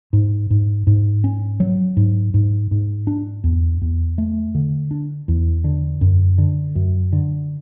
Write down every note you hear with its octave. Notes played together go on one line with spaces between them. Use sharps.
G#2
G#2
G#2
C#4
F#3
G#2
G#2
G#2
D4
E2
E2
A3
D3
D4
E2
D3
F#2
D3
F#2
D3